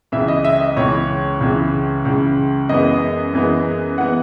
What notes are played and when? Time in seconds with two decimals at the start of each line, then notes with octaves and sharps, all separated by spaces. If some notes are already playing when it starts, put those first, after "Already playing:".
0.12 C#2 C#3 E3 E5
0.28 D#5
0.44 E5
0.60 D#5
0.77 C#2 C#3 E3 C#5
1.41 C#2 C#3 E3
2.05 C#2 C#3 E3
2.69 F#2 E3 G#3 B3 D#5
3.34 F#2 E3 G#3 B3
3.98 E3 G#3 B3 F#5